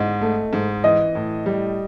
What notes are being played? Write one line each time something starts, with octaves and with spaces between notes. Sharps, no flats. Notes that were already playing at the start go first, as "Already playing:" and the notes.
Already playing: G#2 D#5
A3
G#2
E3 D#5
A2
G3